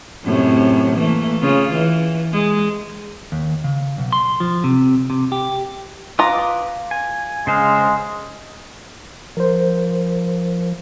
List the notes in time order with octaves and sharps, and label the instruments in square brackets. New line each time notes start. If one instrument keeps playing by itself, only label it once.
[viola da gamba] F#2 A2 C3
E3 A3 A#3
C#3 F4
E3
G#3
[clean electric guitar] D#2
C#3
B1
C6
F3
C3
C3
G4
[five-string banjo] F4 A#5 [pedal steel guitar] B4 D6 D#6
[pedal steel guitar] G#5
[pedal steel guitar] C#3 C5 F5 [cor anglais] G#3
[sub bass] F3 [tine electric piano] A#4 C5